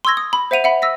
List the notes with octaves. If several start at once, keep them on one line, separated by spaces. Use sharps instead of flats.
C6 C#6 E6 G#6 A#6
D#6
B5
C5 E5 F#5 D#7 F7
E5 F#5 B5
E6 A#6 B6